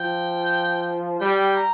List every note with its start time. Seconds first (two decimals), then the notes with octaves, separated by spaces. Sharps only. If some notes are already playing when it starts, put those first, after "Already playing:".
Already playing: F3 G5
1.21 G3 G5
1.56 A#5